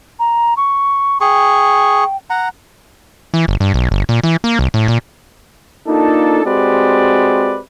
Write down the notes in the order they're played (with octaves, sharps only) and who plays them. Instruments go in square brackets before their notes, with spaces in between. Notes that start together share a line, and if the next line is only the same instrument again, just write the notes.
[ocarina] A#5
C#6
[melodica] G#4 C#6 [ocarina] G5
[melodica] F#5 A#5
[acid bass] E3
G1
G2
B1
G1
A#2
E3
A#3
C2
A2
A#2
[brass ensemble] A#3 D4 D#4 F4 A4
G#3 C4 F#4 G4 B4 D5